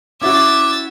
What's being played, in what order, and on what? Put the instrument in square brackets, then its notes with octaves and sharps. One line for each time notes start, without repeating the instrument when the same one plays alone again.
[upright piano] C#4 E4 F#4 [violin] E5 A6 [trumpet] D6